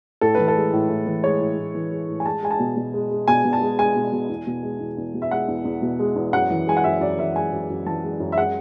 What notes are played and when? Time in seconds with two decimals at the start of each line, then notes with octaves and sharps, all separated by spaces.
0.21 A2 A4
0.35 E3 B4
0.48 A4
0.55 G#3
0.73 A2
0.89 A2
1.07 E3
1.24 G#3 C#5
1.41 A2
1.58 A2
1.75 E3
1.91 G#3
2.09 A2
2.20 G#5
2.25 G#3 A5
2.43 G#3 G#5
2.51 A5
2.59 B2
2.77 B2
2.94 G#3
3.11 G#3
3.28 B2 G#5
3.44 B2
3.53 A5
3.61 G#3
3.79 G#3 G#5
3.96 B2
4.12 B2
4.30 E2
4.47 B2
4.63 G#3
4.80 E2
4.98 E2
5.14 B2
5.22 E5
5.31 G#3 F#5
5.48 E2
5.65 E2
5.82 B2
5.99 G#3
6.16 E2
6.33 F#2 F#5
6.50 E3
6.67 G#3 G#5
6.77 F#5
6.84 F#2 E5
7.01 F#2 D5
7.18 E3 E5
7.35 G#3 G#5
7.53 F#2
7.70 F#2
7.86 E3 A5
8.03 G#3
8.20 F#2
8.32 E5
8.37 G#3 F#5